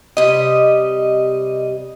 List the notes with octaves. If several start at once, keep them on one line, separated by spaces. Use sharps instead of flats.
C3 G3 D#5